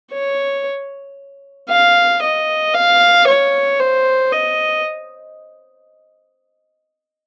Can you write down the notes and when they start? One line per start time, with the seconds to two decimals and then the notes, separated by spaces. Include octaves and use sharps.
0.12 C#5
1.70 F5
2.22 D#5
2.74 F5
3.27 C#5
3.79 C5
4.32 D#5